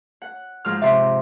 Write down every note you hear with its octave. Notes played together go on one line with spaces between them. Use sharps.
F#5
G#2 F3 F6
C3 E5 C6